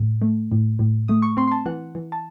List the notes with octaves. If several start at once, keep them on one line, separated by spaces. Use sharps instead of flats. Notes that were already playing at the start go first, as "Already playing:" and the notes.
Already playing: A2
A3
A2
A2
A3 D#6
C#6
C4 C6
C6
A5
E3 F#5
E3
A5